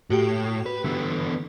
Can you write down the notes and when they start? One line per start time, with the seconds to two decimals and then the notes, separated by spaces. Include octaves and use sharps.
0.10 A2 F#4 G4 G5
0.66 B4
0.84 D3 E3 B3